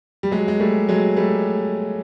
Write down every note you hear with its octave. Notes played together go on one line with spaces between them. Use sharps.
G3
F#3 G#3
G#3
G3 A3
F#3 G#3
G3 A3